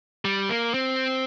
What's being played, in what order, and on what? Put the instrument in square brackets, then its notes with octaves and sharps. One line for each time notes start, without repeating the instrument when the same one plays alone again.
[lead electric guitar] G3
A#3
C4